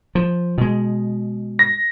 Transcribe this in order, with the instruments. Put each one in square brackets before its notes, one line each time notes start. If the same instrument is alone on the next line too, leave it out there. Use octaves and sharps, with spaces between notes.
[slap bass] F3
B2 G#3
[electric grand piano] A#6